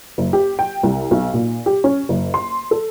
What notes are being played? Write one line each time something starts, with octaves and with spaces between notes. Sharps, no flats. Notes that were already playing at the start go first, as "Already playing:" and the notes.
F#1
G4
G5
C2
B1
A#2
G4
C#4
F#1
C6
A4